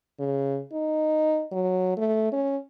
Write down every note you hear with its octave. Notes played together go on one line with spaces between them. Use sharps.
C#3
D#4
F#3
A3
C#4